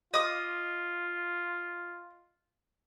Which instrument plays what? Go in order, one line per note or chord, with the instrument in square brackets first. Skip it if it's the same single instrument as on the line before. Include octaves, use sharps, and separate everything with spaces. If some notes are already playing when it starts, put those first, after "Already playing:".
[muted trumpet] F4 [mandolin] D#5 D6 D#6